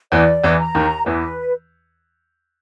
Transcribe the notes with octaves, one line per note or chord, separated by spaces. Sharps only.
E2 E3 D5
E2 E3
A#5
D#2 D#3
E2 E3 B4